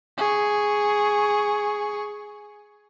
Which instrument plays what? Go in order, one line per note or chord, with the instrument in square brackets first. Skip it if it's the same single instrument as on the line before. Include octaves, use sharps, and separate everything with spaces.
[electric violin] G#4 C#6